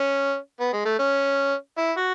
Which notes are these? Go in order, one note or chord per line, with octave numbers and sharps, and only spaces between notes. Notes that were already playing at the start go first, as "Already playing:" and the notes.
Already playing: C#4
B3
G#3
A3
C#4
E4
F#4